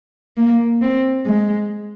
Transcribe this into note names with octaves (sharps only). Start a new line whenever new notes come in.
A#3
C4
G#3